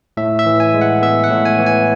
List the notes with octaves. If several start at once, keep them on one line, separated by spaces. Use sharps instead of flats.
A2 E5
E5
E3
G#5
G#3
F#5
B3 E5
F#5
A2
G#5
E3
G#5